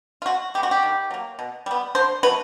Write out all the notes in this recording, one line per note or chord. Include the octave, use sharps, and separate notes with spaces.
F4
B2 F#4
G#3 B3 G4
F#4
G4
D#3
F#3 A#3
B2
G3 B3
D3 C5
F#3 A3 B4